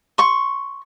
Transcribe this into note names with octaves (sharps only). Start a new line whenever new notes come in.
C6 C#6